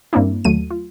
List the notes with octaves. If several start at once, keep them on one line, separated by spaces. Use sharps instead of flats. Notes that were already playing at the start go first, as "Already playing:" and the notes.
G2 A#3 C4 D4 E4
D#2 F#3 A3 D#7
F4